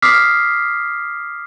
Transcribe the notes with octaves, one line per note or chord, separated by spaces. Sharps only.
D6 D#6 F6 B6 C7